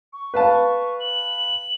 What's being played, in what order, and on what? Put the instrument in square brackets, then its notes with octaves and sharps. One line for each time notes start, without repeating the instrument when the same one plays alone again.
[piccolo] C#6
[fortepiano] B4 F5 A5
[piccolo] F#7